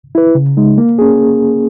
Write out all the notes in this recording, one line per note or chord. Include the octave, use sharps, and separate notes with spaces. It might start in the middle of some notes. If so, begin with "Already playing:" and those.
E4 B4
C#3
G#3 D#4
A#3
C#4 G#4